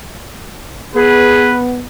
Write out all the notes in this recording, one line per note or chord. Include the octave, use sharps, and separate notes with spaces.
B3 G#4 B4